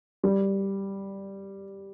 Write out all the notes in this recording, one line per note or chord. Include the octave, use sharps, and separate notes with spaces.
G3